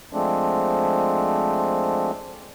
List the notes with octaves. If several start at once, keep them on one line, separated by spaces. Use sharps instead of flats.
F3 G#3 A3 C4 D4